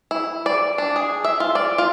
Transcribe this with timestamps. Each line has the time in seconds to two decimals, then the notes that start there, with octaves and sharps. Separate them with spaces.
0.11 E4
0.46 D5
0.78 D4
0.96 G#4
1.25 E5
1.40 F4
1.55 D5
1.78 F4